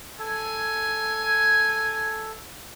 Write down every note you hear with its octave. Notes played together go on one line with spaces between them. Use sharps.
A4 G#5